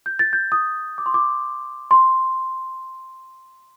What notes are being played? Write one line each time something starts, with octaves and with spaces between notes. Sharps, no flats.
G6
A6
G6
D#6
D6
C6
D6
C6